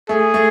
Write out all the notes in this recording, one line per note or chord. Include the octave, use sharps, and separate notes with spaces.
A3 G#4
A3